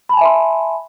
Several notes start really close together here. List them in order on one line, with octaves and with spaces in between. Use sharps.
B5 A5 G#5 E5 C6